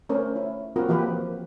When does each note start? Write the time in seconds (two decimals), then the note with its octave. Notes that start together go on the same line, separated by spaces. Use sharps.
0.09 A3 C#4 A#4 C5
0.36 E4
0.76 A#3 C4 F4 F#4 A#4
0.88 E3 F3 A#3 G4 B4